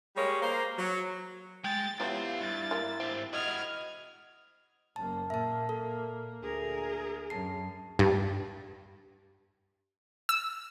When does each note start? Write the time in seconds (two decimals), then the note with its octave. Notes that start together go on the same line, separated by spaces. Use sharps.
0.16 G3 G#3 A#3 C#5
0.42 A#3 C5
0.78 F#3
1.64 G#3 G5 A6
2.00 F3 F#3 B3 E4 G4 C5 F5
2.41 G2 A6
2.71 A#3 F4
3.00 G#2 C4 G4
3.33 E4 F#4 D#5 F6 G#6
4.96 F#1 A#3 A5
5.30 A#2 A#3 E5 A5
5.69 A4
6.42 D2 G#4 A#4
7.30 F#2 A5 C7
7.99 G2
10.29 E6